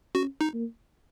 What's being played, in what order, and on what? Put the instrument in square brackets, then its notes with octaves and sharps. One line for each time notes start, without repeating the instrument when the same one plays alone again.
[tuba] C#4 [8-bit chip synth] F#4
[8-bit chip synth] D#4
[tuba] A#3